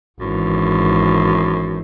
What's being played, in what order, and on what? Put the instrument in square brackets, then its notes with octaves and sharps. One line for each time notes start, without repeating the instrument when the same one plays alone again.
[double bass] G#1 E3 [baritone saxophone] F#2